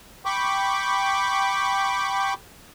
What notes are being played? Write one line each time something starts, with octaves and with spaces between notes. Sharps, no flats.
G5 B5 C#6 D6